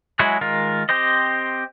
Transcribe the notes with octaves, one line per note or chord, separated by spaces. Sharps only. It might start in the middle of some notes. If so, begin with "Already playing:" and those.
F#3 G#3 E4 F#4 G#4
D#3 G#3 F4 A#4
C4 G4 C5 D#5